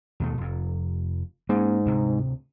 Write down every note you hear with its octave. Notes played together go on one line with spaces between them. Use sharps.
D#2 B2 A3
F1 F2
G#2 A#3 C#4
D2 C3